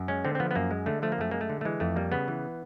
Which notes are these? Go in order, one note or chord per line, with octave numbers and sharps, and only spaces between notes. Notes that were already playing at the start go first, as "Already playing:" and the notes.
Already playing: F#2
G#3 C#4
D3 C4
C4
F3 B3
B3
F#2 A#3
G#3
D3 A3
F3 A3
A#3
F#2 A3
G#3 A#3
A3
D3
A3
E3 G#3
F2 A3
G3 A#3
C#3 B3
E3